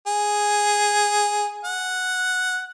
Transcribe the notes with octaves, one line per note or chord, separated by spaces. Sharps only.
G#4
F#5